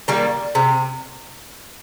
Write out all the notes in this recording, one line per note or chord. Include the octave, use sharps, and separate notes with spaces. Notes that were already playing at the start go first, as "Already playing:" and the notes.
D#3 G3 A#3
C3